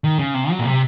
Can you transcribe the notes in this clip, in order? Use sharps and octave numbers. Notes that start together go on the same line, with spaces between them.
D#3
C#3
C3
F#3
A#2
C3